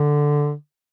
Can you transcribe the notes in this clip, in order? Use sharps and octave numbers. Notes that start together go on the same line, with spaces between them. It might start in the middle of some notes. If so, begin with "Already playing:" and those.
Already playing: D3